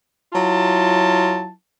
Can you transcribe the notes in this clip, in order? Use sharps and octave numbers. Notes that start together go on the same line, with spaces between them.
F#3 E4 F4 A5